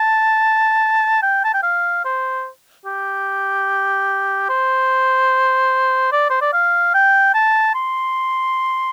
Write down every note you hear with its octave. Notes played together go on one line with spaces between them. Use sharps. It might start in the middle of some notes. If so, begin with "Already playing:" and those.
Already playing: A5
G5
A5
G5
F5
C5
G4
C5
D5
C5
D5
F5
G5
A5
C6